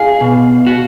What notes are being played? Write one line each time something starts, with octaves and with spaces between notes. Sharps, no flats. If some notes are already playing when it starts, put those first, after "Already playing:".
Already playing: G#4 F5
B2
F#4